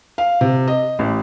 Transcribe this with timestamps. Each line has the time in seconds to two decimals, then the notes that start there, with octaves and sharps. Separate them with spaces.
0.18 F5
0.41 C3
0.68 D#5
0.99 A1